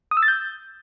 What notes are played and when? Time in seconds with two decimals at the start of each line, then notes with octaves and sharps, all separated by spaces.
0.11 D#6
0.17 E6
0.23 A6
0.28 G6